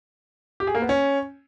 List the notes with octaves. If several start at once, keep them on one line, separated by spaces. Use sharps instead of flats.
G4
G#4
A#3
B3
C#4